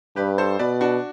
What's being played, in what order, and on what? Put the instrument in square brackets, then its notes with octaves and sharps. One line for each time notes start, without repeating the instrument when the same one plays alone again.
[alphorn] G2 [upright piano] G4 B4
[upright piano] A4 C5
[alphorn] B2 [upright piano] B4 D5
[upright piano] D4 F#4